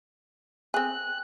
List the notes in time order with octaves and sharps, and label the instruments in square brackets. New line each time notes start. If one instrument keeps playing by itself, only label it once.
[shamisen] C4 G#4 [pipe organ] F#6